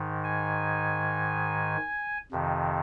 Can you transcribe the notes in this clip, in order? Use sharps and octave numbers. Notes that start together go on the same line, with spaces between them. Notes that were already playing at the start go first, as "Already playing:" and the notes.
Already playing: G#2 D#3
G#5
F2 C3 D#3